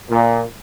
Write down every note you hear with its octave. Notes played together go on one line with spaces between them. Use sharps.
A#2